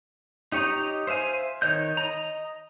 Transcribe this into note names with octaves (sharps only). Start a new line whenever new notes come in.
D#4 G4 C#5 D#5 A#5
C5 E5 F5 G#5
D#3 C#5 D#5 G6
D#5 A#5